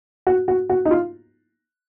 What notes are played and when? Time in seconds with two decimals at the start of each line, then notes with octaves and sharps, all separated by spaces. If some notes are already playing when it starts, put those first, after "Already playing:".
0.27 F#4
0.48 F#4
0.70 F#4
0.85 D#4
0.91 F4